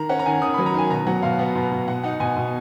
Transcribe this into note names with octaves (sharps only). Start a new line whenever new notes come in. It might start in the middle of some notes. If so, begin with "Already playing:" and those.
Already playing: D#3 A#5
C#4 F#5
A#5
D#3 G#5
D#3 D#6
F#3 B5
A#5
D#3 G#5
B2 A#5
F#3 F#5
B2 F5
B3 F#5
B2
B2
B2 F#5
D#4 F#5
B2 G#5
B2